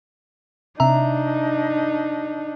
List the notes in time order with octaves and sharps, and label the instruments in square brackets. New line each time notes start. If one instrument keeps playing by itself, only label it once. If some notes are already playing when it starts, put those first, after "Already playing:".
[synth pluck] C3 E5 [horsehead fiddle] D4 [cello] D#4 [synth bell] A#5